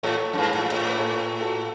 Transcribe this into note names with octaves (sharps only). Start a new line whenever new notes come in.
A2 A4 C#5
F#2
G#2 G#4 B4
A2
A2 C#5
B4
A4 C#5
F#4 A4